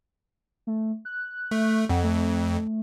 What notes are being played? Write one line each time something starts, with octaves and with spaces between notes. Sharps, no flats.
A3
F#6
A3
F2 F#5
A3